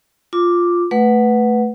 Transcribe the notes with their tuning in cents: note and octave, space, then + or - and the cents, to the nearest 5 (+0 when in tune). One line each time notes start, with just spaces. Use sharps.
F4 +0 D6 +0
A3 +0 B4 +0 F#5 +0